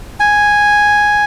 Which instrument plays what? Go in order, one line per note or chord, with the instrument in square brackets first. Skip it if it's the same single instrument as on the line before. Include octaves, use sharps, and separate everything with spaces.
[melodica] G#5